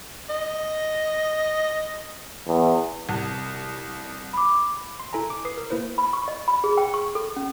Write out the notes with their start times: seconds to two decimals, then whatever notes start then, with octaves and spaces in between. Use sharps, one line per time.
0.29 D#5
2.48 E2
3.09 C2
4.33 B5 D6
5.00 C6
5.13 E4 A4 G#5 A#5
5.30 D6
5.45 B4 D#6 C7
5.58 A#4
5.70 A#3 E4 B4 C5
5.98 B5
6.13 C#6
6.28 D#5
6.48 B5
6.64 G#4
6.77 G5
6.94 C#6
7.15 A4
7.36 C#4